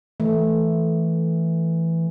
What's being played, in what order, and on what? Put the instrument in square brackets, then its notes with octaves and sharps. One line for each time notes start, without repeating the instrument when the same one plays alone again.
[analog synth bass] E3 [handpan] A3